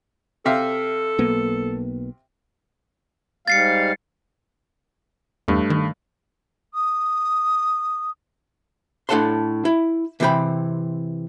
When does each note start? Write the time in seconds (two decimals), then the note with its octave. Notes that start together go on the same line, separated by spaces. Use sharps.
0.45 C3 A4 E5 F5
1.18 B1 A#3 B3
3.48 G#2 G3 F5 A6 C7 C#7
5.48 E2 G2 A3
5.70 D#3
6.74 D#6
9.09 A2 D4 A4 F#5 A5 C6
9.65 E4
10.20 C3 E3 C4 A#4 G5 B5